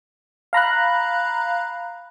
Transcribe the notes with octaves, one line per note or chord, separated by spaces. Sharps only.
F5 A#5 B5 F#6